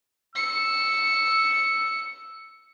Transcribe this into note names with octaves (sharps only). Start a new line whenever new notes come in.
E6 C#7